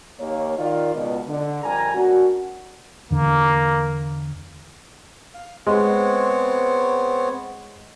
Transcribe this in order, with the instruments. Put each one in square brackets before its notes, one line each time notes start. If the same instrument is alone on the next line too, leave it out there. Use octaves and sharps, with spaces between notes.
[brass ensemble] D#2 A#3 C#5
D#3 F4 D5
C#2 B2
D3
F2 G3 A#4 G#5 A#5
A#3 C#4 D4 F#4
[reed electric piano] E2 D3 [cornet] A#3
[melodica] F5
[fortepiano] G#3 [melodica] B3 C4 C#5